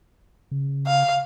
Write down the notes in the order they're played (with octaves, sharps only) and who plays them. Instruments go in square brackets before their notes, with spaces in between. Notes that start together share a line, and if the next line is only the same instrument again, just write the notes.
[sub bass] C#3
[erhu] F5